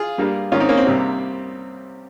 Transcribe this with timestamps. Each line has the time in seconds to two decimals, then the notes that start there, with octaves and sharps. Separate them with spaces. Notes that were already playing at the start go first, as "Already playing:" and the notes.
Already playing: F4 G#4
0.18 G2 G3 A#3
0.52 G#2 D#3 A#3 C#4 F4
0.60 C4 D#4
0.69 A#3 C#4
0.77 C4
0.86 C2 C3 G3 A#3